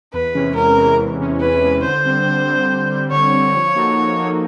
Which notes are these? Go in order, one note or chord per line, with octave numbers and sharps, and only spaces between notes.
E2 B4
C3 E3 G#3 C#4
E2 A#4
C3 E3 G#3 C#4
E2
C3 E3 G#3 C#4
E2 B4
C3 E3 G#3 C#4
D3 C5
G3 C4
D3
G3 C4
D3
G3 C4
D3 C#5
G3 C4
F3
A#3 D#4 F#4 A4
F3
A#3 D#4 F#4 A4